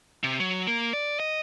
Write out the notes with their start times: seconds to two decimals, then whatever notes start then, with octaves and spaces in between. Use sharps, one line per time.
0.24 C3
0.40 F#3
0.67 A#3
0.93 D5
1.20 D#5